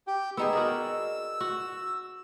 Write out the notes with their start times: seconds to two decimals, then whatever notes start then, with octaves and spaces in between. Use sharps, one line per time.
0.07 G4 G5
0.37 B3 D#4 G#4 E6
0.53 F#4 A#4 D5
1.40 F#4